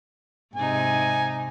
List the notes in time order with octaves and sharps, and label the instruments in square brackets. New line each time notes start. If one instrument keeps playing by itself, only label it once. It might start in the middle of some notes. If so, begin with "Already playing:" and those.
[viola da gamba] G#2 C3 D#4 [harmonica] G#5